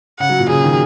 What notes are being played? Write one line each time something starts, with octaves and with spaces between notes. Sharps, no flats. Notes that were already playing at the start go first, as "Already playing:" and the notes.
C#3 F#5
F#3
A#2
C#3 G#4
D#3